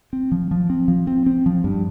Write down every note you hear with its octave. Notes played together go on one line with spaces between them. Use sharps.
C4
F3
F3
C4
F3
C4
C4
F3
G2